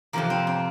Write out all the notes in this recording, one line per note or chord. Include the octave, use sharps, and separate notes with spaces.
F2 C3 F3 A#3
C4
C4